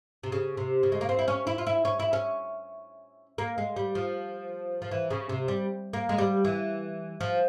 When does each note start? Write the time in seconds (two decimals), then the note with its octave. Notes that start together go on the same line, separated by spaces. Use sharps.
0.23 C3
0.32 C#3
0.57 C3
0.83 C#3
0.92 G#3
1.01 A#3
1.09 C4
1.19 E4
1.28 C#4
1.47 E4
1.58 F4
1.67 E4
1.85 C#4
2.00 E4
2.13 C#4
3.38 A#3
3.58 G#3
3.76 G3
3.95 F3
4.82 F3
4.91 E3
5.11 C#3
5.29 C3
5.48 G3
5.93 A#3
6.09 G#3
6.18 G3
6.45 E3
7.21 F3